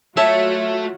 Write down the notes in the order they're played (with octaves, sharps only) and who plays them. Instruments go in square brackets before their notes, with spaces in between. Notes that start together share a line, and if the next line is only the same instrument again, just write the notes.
[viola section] F#3 F4 F#4 [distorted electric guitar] A3 [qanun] C#5 A5 [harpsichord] E5